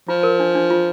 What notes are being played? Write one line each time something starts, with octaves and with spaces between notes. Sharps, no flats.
F3 F4
A#4
D4
D4
F4